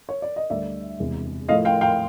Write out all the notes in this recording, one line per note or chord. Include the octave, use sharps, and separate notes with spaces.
C#5
D5
D#5
D2 D3 G3 D5 E5
E1 E2 C3
A2 F3 A3 D#5 F5
F5 G5
F5 G5